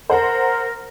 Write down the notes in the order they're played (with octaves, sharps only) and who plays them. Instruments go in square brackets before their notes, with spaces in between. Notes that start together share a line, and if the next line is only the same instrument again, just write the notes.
[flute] A#4 [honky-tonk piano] C5 F#5 A#5